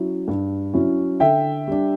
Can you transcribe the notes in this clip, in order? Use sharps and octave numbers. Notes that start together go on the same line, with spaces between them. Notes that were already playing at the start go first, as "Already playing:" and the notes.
Already playing: F#3 C#4 E4
G2
F#3 C#4 E4
D3 E5 G5
G3 D4